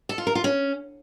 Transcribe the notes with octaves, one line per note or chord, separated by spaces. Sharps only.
A4
F4
A#4
F4
C#4